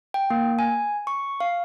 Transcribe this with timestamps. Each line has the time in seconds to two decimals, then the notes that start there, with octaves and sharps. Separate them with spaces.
0.14 G5
0.30 A#3
0.59 G#5
1.07 C#6
1.40 F5